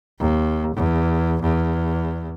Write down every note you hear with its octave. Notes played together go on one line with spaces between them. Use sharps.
D#2
E2
E2